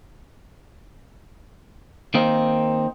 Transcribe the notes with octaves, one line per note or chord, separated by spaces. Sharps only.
D#3 A#3 C4 D#4